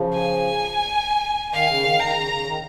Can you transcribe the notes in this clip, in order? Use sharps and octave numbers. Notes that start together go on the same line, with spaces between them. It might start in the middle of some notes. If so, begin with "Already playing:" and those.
Already playing: C#3 F3
G#5
D#3 F5
C#3
D#3
D#3 A#5
C#3
C#3
D#3